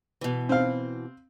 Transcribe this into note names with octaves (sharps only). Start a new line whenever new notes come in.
B2 E3
C4 F5